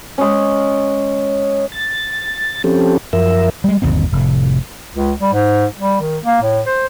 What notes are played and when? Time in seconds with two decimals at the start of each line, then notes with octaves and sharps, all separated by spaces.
0.18 G#3 C#4
1.72 A6
2.64 F3 C4 C#4 G4 A4
3.13 F#2 F3 A#4 E5
3.64 G3 G#3
3.82 G1 D#2 B2 C4
4.12 F1 A2
4.95 C#2
5.21 G3
5.33 G#2
5.79 G3
6.00 D#3
6.25 A#3
6.42 A2
6.66 C5